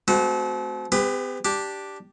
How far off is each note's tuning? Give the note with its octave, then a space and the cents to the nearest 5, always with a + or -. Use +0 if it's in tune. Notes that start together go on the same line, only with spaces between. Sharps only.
A3 -40 C4 -25 F#4 +0
B3 +45 G4 +45 B4 +0
D4 +0 G4 +0